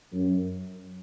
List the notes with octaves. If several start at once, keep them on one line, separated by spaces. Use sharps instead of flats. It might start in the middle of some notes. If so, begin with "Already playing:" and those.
F#2